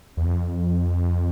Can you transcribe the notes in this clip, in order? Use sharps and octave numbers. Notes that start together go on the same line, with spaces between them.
E2
F2